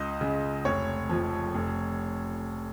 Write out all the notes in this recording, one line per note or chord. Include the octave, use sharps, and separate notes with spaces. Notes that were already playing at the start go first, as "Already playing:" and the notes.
Already playing: C#2 D#5
C#3 G#3
F1 C#5
F2 F3
F1